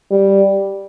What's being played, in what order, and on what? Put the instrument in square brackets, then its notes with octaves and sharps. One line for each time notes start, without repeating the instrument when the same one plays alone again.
[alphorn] G3